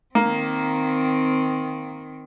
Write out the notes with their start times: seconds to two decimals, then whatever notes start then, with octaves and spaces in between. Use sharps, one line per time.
0.15 D#3 A#3 C4